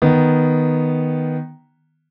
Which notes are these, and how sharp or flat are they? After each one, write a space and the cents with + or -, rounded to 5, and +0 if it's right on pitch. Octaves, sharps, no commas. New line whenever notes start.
D#3 +0 B3 +0